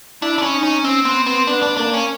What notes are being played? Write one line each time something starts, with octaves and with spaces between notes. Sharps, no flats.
D4 E4
D4
C#4
D#4
C#4
C4 C#4
B3 C4
B3 C4
B3 D4
D4
A#3 D4
C#4